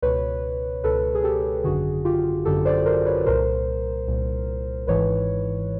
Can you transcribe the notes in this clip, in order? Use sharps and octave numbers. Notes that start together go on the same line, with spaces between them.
C#2 B2 B4 C#5
C#2 B2 A4 B4
G#4
G4 A4
G#1 F#2 D3 F#4 G#4
F4 G4
G#1 F#2 D3 G4 A4
C5 D5
A#4 C5
B4 C#5
C2 A#2 A#4 C5
C2 A#2
G#1 G#2 E3 B4 C#5